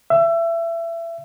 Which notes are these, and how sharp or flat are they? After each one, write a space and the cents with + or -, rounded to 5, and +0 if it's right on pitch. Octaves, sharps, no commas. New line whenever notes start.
E5 +25